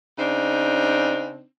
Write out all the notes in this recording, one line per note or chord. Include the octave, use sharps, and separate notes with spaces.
C#3 C4 D4 D#4